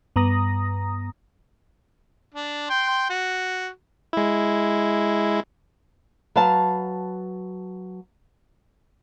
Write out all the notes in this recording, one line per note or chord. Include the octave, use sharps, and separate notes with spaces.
G2 B3 A#5 D#6 A#6
D4
G5 C6
F#4
G#3 E4
F#3 B4 F5 A5